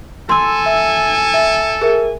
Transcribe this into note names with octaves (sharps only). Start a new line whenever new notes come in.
A4 G#5 C6 E6
E5 E6
E5
G#4 A#4 E5